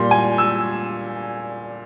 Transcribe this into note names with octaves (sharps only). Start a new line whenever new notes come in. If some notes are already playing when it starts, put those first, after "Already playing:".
Already playing: A#2 G3 C6
G#5
E6